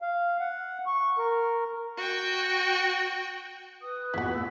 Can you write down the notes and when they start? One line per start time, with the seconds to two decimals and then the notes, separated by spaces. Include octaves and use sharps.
0.02 F5
0.40 F#5
0.86 C#6
1.18 A#4
1.97 F#4 G5
3.81 B4 D#6
4.14 A1 E2 A#2 E4 F#4 B6
4.34 A#2 E6